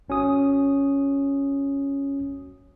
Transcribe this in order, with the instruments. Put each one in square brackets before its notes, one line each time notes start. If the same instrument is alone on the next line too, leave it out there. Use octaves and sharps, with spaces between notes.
[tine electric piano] G#1 C#4 F#4 D#6